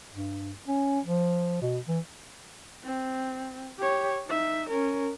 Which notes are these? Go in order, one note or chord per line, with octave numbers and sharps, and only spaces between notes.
G2
C#4
F3
B2
E3
C4
G4 C#5
D#4 E5
C#4 A#4